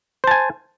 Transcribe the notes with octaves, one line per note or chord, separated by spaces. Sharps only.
C5 G#5 A5